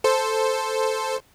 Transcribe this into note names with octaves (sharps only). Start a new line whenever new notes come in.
A4 C5